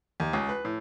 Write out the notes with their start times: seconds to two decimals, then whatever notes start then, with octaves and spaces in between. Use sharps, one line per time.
0.20 D#2
0.33 C#2
0.49 B4
0.65 A2